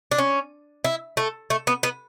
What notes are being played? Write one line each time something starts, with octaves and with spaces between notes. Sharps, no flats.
D4
C#4
E4
A3
A3
B3
B3